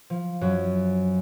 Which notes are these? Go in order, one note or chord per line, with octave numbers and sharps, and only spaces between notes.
F3
F#2 F#3